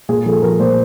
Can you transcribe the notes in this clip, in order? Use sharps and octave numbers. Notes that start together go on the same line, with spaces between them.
A#2 G#4
F3 A4
F3 A#4
A#2 C5